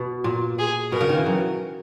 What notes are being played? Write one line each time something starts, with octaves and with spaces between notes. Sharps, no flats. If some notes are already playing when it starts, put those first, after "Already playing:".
Already playing: B2
A#2
G#4
B2 A#4
C#3
D#3
E3
F#3